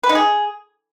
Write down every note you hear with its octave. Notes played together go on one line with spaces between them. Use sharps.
B4
D#4
G#4